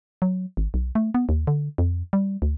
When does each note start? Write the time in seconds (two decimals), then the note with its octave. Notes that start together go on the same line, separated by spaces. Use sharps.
0.22 F#3
0.57 G#1
0.74 B1
0.95 A3
1.14 B3
1.29 D#2
1.47 D3
1.78 F2
2.13 G3
2.42 D2